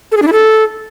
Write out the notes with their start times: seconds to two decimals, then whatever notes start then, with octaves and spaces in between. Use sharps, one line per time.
0.12 A4
0.17 G#4
0.22 D4
0.27 E4
0.33 A4